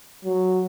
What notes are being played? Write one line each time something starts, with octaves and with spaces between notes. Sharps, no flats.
F#3